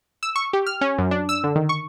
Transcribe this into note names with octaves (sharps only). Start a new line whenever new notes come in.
E6
C#6
G4
F6
C#4
F#2
D4
E6
D3
D#3
C#6